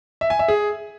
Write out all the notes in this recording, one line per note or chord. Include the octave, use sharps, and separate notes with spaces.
E5
G#5
E5
G#4